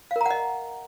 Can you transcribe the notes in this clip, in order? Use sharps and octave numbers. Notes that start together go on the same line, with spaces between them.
A#4 D#5 F5 F#5 A#5